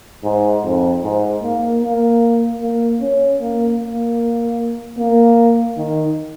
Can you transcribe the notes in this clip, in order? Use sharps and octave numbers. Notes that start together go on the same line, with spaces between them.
G#2
F2
G#2
A#3
A#3
A#3
C#4
A#3
A#3
A#3
D#3